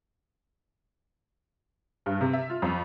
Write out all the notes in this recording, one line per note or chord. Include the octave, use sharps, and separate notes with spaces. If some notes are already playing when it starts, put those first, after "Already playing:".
G2
C3
E5
F4
F2